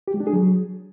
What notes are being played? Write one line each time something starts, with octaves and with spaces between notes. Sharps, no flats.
G4
G#3
D4
G#4
F#3